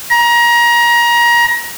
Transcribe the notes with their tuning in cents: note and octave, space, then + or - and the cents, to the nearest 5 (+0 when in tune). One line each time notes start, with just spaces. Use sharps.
A#5 +25